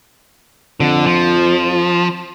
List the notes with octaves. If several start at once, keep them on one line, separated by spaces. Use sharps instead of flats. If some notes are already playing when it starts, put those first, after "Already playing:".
F2 D3
F3